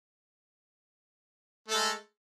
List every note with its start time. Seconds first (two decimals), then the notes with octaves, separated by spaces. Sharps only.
1.68 A3
1.71 A4
1.74 G#3